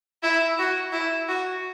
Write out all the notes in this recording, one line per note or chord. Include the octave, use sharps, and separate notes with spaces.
E4
F#4
E4
F#4